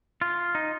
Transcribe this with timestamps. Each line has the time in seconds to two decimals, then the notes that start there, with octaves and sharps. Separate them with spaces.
0.22 F4
0.55 D#4